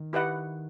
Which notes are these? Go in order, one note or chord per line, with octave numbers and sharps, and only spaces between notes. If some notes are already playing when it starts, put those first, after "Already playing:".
Already playing: D#3
E4 G4 B4 D#5 F#5